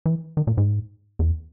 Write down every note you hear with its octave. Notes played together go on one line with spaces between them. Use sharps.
E3
D#3
A#2
G#2
E2